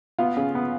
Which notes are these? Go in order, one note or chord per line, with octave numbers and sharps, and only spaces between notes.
B3 F4
C#3
B3